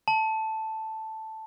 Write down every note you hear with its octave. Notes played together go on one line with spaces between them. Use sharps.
A5